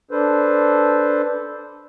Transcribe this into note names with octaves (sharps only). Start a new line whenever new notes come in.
D4 A4 B4 C5